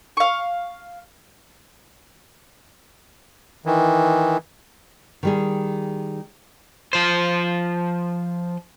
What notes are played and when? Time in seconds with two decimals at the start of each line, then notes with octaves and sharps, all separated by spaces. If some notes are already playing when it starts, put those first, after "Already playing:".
0.17 F5 C#6
3.65 D#3 E3
5.23 D#3 G3 G#4
6.93 F3 C5